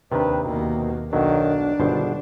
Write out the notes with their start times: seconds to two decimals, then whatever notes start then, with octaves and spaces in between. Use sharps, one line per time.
0.12 D#2 C3 D#3 D4 B4
0.44 D#2 B2 A#3
1.13 B1 D#3 F#3 D4
1.80 G1 B2 D#3 C5